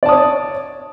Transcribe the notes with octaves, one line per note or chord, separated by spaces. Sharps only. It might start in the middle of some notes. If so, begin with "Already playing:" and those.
C#5 D5 A5 D#6